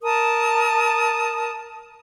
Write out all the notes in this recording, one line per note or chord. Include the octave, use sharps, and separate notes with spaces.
A#4 A5 D#6